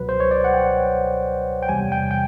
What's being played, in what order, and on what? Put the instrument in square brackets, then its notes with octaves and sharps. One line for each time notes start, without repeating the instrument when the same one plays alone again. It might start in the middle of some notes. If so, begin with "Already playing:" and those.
Already playing: [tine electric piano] C#2 B2 F#3 B4
C5
C#5
D5
F#5
G5
G5
E2 C3 E3 G3 G#5
G5
G5